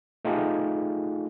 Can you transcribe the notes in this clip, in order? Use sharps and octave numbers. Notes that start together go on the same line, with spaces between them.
A3 D#4 F4 G4 G#4